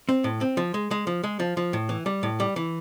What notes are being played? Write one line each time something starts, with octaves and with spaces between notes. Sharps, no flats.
C4
A2
C4
F3
G#3
G#3
F3
G#3
F3
F3
A2
E3
G3
A2
G3
E3